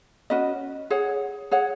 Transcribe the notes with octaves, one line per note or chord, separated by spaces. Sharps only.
C#4 F#4 B4 D#5
G#4 C#5 F#5
G#4 C#5 F#5